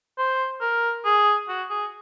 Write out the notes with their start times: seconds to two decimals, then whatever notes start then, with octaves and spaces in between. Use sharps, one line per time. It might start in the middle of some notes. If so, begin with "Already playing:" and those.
0.18 C5
0.61 A#4
1.05 G#4
1.49 F#4
1.70 G#4